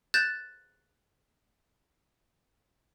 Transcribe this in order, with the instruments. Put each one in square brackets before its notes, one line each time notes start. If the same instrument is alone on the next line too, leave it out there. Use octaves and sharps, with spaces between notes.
[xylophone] F#6 G6 A6 E7